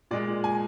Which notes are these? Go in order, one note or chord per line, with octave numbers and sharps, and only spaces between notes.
A#2 G#3 D5
G#5